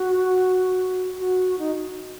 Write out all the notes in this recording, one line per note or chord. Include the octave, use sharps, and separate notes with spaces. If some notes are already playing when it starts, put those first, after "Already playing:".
Already playing: F#4
F#4
D#4